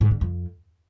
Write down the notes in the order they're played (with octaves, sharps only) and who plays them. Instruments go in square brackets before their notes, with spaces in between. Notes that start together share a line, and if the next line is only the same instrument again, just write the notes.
[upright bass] G#2
D3
F2